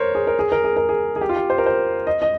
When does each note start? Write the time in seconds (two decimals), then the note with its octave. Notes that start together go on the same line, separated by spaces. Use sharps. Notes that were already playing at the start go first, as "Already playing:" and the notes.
Already playing: A#4 C5 C#5
0.15 G#4
0.27 A#4
0.39 G#4
0.52 A#4
0.64 G#4
0.76 A#4
0.89 G#4
1.16 G#4
1.21 G4
1.29 F4
1.36 G4
1.50 C5
1.58 A#4
1.66 C5
2.07 D#5
2.22 D#5